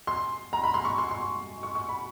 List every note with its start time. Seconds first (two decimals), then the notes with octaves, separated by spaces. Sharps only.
0.07 C6
0.53 A#5
0.63 B5
0.74 C6
0.85 C#6
0.98 C6
1.11 C6
1.63 C#6
1.75 C#6
1.89 B5